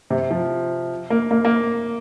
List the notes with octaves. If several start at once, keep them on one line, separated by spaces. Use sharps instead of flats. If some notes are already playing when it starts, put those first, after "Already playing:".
C3
F3
A#3
A#3
A#3